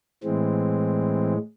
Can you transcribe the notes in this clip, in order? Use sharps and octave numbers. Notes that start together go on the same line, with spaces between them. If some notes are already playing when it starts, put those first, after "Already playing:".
A2 E3 G#3 C4